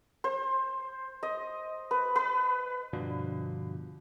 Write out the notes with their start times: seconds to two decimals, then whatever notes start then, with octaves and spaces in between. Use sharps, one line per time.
0.24 C5
1.23 D#5
1.91 B4
2.16 B4
2.93 G2 B2 D3 F3